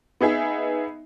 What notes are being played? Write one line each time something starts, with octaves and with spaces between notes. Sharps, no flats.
B3 D#4 G#4 E5